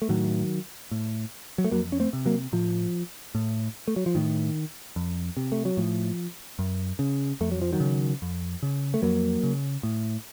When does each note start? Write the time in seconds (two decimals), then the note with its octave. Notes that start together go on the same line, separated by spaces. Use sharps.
0.02 A3
0.09 A2 D#3 F#3
0.91 A2
1.58 F#3
1.65 A3
1.71 F2 F#3 A#3
1.92 C#4
2.00 A3 C4
2.13 C3
2.26 F#3 A#3
2.53 A2 F3
3.35 A2
3.88 A3
3.96 F#3
4.06 F3
4.15 A2 D#3
4.96 F2
5.37 C3
5.52 A3
5.65 F#3
5.77 A2 F3
6.59 F#2
6.99 C#3
7.41 F2 A3
7.52 F#3
7.62 F3
7.73 D#3 F#3
7.80 C#3
8.22 F2
8.63 C#3
8.94 A3
9.02 F2 F#3 A#3
9.43 C#3
9.83 A2